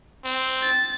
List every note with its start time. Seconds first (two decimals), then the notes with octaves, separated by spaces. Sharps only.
0.24 C4
0.62 A6